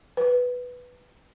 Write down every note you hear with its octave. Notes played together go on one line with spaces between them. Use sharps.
B4